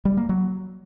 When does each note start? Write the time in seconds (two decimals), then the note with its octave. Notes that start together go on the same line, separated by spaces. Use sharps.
0.05 G3
0.17 A#3
0.29 F#3